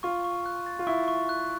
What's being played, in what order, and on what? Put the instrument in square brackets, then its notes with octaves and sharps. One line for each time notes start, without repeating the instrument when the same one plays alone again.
[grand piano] F4 [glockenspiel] C#6
[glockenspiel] C#6
F#6
A6
[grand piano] F4
[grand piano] E4 [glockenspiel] C#6
[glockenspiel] C#6
F#6